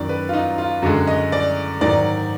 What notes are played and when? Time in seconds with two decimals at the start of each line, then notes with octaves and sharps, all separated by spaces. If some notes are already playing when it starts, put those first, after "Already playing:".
Already playing: F#2 D#3 F#3 D5
0.09 B4
0.29 F4
0.34 D#4
0.58 F4
0.82 F#2 D3 G#3 F#4
1.07 D#5
1.32 D5
1.81 G#2 D#3 F#3 D5